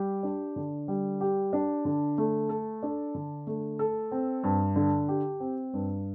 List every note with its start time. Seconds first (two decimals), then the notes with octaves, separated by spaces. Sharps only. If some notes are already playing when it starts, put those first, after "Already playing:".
Already playing: G3 G4
0.23 D4
0.56 D3
0.88 G3
1.21 G4
1.53 D4
1.85 D3
2.18 A3
2.49 A4
2.83 D4
3.15 D3
3.47 A3
3.79 A4
4.12 C4
4.44 G2
4.76 D3
5.08 G4
5.40 C4
5.74 G2